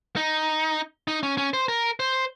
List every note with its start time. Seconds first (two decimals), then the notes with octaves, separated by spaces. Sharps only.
0.16 D#4
1.08 D#4
1.23 C#4
1.38 C#4
1.53 C5
1.68 A#4
2.00 C5